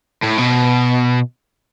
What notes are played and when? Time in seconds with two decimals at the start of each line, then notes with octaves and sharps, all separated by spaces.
0.23 A2
0.38 B2